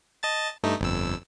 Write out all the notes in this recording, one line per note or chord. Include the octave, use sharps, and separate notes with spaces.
D#5 A5 A6
G2 A3 D#4
G1 F2 E6